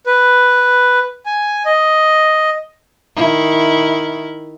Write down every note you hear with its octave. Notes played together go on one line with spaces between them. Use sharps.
B4
G#5
D#5
D#3 E4